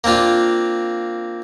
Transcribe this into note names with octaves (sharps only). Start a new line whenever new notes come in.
A#3 C4 D4 F4